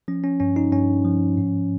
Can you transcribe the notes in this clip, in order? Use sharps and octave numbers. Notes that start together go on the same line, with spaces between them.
F3 C#4
C#4
G2 C#4
D#4
G2 C#4
F3
G#2